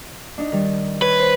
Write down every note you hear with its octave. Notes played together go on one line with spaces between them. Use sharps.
D4 D#4
D#3 G3
B4 C#5
C5